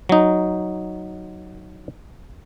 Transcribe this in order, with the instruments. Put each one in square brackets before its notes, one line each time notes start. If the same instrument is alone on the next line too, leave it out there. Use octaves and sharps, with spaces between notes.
[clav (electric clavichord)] F#3 D#4